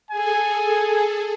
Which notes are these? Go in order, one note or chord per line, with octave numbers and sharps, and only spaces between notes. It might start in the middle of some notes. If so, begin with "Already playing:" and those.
G#4 A4 G#5